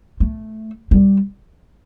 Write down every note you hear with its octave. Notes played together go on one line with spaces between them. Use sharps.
A3
G3